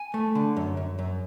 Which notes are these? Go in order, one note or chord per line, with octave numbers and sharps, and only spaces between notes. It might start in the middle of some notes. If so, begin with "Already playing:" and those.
Already playing: G#5
A3
D3
F#2
F#2
F#2